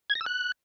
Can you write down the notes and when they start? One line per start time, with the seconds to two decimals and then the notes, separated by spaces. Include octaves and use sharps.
0.10 G#6
0.15 A#6
0.21 E6
0.26 F#6